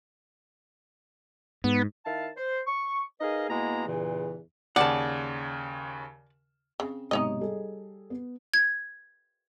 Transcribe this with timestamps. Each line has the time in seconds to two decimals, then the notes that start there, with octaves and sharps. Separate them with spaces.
1.64 G#2 B3
2.06 D#3 E4 F5 A5
2.37 C5
2.67 C#6
3.21 D#4 G#4 A#4 B4 D#5 F5
3.50 B2 G#3 A#3 B3 E4 A#5
3.87 E2 G2 A#2 C#3 E3
4.76 D#2 C#3 D5 F#5 A5
6.80 C#3 C4
7.11 B1 G#2 C3 D#4 C#5 D#5
7.41 G3 G#4 A4
8.10 B3
8.54 G#6